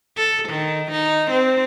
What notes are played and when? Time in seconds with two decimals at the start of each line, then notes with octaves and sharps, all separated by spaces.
0.17 A4
0.49 D#3
0.91 D#4
1.31 C4